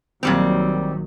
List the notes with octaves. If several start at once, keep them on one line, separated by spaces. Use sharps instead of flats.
A#1 A#2 D#3 F#3 G3 C4